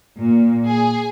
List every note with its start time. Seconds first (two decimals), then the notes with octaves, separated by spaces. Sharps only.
0.19 A#2
0.66 G#4